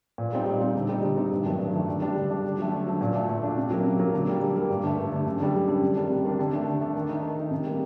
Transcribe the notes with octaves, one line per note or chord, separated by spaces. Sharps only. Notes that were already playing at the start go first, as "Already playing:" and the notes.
A#2
G3 C4 D#4
A#2
G3 C4 D#4
D3
G3 C4 D#4
D3
G3 C4 D#4
G2
D#3 F#3 A3 D4
G2
D#3 F#3 A3 D4
D3
G3 D4
D3
G3 D4
D3
F#3 A3
D3
F#3 A3
A#2
A3 D4
A#2
A3 D4
C3
F#3 A#3
C3
F#3 A#3
D3
G3 A#3
D3
G3 A#3
G2
D3 A3
G2
D3 A3
F#2
D3 G3
F#2
D3 G3
C3
D#3 G3 D4
C3
D#3 G3 D4
D3
A3 D4
D3
A3 D4
D#3
A3 D#4
D#3
A3 D#4
C3
G3 A#3